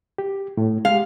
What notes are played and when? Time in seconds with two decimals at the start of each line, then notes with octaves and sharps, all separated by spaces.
0.18 G4
0.57 A2
0.85 G#3 G4 F5